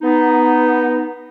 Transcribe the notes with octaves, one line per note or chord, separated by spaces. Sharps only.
B3 D#4